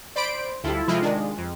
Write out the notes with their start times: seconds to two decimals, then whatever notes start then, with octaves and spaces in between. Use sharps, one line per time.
0.16 C5 D5 B5 D7
0.64 D2 G3 E4 F4 A4
0.88 C3 F3 G#3 E4 F4
1.02 D#3 G#3 D4
1.38 F2